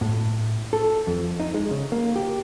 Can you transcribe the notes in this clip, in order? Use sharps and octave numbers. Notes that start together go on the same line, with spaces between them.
A2
A4
F2
D#4
G#3
C#3
A#3
G4